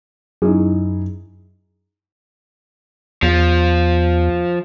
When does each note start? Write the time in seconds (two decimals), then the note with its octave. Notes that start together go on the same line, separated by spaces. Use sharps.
0.42 F#2 D#4 E4 G#4
3.23 E2 F3